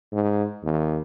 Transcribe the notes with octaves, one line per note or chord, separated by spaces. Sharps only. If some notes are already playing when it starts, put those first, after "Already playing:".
G#2
D#2